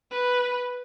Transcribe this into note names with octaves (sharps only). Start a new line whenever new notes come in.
B4